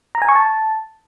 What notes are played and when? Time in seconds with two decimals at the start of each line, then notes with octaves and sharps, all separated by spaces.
0.15 A#5
0.22 G#5
0.29 C#6
0.35 A5